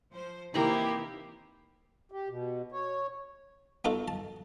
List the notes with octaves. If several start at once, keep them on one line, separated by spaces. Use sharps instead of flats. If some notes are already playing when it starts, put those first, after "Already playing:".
F3 C5
C3 D#3 E3 A#3 D#4 E4 G4 A#5
G4
B2
C#5
B3 D#4 F4 F#4 A4
A5